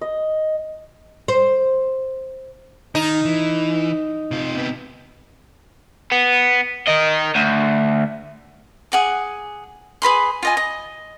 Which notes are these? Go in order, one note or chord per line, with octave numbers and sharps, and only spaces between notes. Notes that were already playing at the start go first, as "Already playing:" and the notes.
D#5
C5
D#3 D#4
E3
C3 F4
C3 B3
B3
A#4 D#5
D2
G#4 F#5 D6
G#4 B4 B5 C6
F4 D#5 G#5
D#5